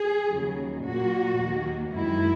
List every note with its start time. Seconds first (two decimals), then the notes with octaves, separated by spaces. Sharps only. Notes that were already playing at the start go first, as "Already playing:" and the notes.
Already playing: G#4
0.31 D#2 C#3 F#3
0.84 A#2 F#3 A#3 F#4
1.39 D#2 D#3 A#3
1.92 F#2 D#3 G#3 E4